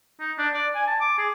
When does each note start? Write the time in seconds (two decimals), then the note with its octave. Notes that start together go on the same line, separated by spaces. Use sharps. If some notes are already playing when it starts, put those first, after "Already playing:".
0.20 D#4
0.38 D4
0.53 D5
0.75 G#5
0.87 A5
1.01 D6
1.18 G#4